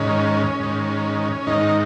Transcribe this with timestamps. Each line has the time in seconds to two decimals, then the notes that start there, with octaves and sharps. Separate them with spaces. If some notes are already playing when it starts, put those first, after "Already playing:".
Already playing: G#2 D#3 C#4
0.60 G#2 D#3
1.47 G#2 D#3 D#4